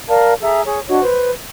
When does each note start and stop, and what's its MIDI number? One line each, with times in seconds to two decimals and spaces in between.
0.09 0.33 70
0.09 0.33 74
0.09 0.33 77
0.09 0.33 81
0.41 0.61 68
0.41 0.61 69
0.41 0.61 76
0.41 0.61 82
0.64 0.79 68
0.64 0.79 73
0.88 1.00 62
0.88 1.00 66
0.88 1.00 73
0.88 1.00 75
1.00 1.30 71
1.00 1.30 72